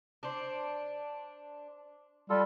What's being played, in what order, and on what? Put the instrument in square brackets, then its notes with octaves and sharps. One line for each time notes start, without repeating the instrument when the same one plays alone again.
[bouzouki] D4 C5
[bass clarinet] G3 [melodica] F4 A4